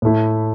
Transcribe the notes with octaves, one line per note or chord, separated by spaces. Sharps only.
A2 A3 E4